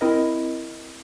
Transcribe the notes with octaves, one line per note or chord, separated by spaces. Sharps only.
C4 E4 A#4 D#5